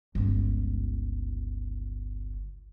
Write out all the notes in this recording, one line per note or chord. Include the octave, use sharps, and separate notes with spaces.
G1 C#2